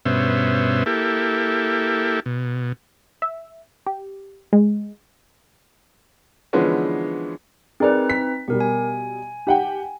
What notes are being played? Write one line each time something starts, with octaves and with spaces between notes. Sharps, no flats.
G2 B2 B3 C#4 C5 E5
A#3 E4 G4 A4
B2
E5
G4
G#3
D3 E3 F3 G#3 B3 C#4
C4 D#4 G#4 A#4 B4 D5
B6
B2 G3 G4 A#4
G#5
G4 F#5 G5